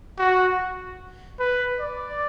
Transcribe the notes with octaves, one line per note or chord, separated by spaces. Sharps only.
F#4
B4
D5